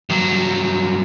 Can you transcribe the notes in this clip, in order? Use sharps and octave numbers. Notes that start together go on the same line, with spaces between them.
G2 F#3